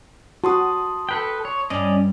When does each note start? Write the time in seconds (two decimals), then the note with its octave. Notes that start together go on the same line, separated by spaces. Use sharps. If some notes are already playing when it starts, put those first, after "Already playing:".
0.44 F#4 A5 C6 D#6
1.09 A4 B4 G5
1.45 C#5
1.70 G2 C#4 D5 D#5